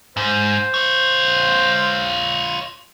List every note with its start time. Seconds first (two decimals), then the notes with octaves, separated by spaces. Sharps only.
0.17 G#2 C5
0.74 F4 C#5